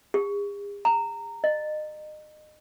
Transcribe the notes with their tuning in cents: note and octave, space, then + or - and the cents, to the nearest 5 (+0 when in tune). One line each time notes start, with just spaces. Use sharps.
G#4 -45
A#5 -15
D#5 -30